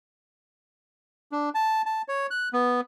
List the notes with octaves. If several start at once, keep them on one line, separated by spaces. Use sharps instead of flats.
D4
A5
A5
C#5
F#6
B3